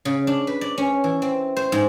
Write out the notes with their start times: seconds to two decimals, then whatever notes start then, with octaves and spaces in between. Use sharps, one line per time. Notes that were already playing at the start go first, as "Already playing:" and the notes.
0.05 C#3
0.27 D4
0.47 B4
0.61 D5
0.78 C#4
1.04 E3
1.22 C4
1.57 C5
1.72 G#2